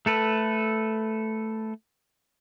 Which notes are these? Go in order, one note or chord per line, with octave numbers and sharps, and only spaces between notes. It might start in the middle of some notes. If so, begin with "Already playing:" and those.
A3 A4 B4